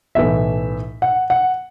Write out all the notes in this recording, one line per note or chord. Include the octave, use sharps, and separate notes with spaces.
B1 A2 E3 E5
F#5
F#5